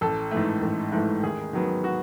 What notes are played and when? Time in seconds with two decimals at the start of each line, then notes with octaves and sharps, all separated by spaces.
0.01 A1 A4
0.31 G#2 E3 A3
0.62 A1
0.92 G#2 E3 A3
1.23 D#2 G#4
1.53 D#3 F#3 B3
1.84 F#4